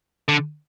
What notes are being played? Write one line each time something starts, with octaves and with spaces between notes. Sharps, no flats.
D3